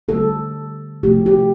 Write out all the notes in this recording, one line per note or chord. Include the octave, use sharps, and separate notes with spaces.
D3 G3 A4
C3 F3 A3 G4
G4